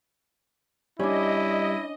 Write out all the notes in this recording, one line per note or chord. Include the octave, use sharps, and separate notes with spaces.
G3 C#4 D4 E4 D#5